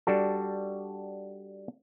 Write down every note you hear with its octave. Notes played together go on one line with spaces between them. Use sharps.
G3 D4 F#4 A4